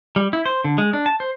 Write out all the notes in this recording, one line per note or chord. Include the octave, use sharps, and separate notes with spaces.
G3
E4
C5
D3
G#3
D4
A5
C5